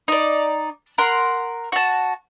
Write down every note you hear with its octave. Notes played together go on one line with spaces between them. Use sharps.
D#4 D5
A#4 F#5 C6
F#4 A5